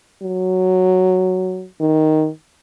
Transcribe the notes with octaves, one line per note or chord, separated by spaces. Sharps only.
F#3
D#3